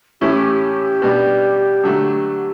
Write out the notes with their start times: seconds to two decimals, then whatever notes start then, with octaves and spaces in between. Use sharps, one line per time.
0.21 A2 E3 A3 C#4 E4 G4
1.02 B2 G3 D4
1.83 D3 F#3 A3